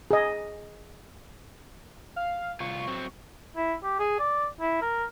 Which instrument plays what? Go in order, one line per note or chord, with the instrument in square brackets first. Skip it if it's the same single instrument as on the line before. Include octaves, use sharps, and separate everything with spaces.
[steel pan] G#4 D#5
[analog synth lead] F5
[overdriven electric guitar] C2 F4 [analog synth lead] C#6
[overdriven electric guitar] F#3 C4
[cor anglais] E4
G4
G#4
D5
E4
A#4